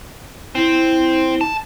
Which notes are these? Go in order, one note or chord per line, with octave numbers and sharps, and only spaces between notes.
C4 E4
A5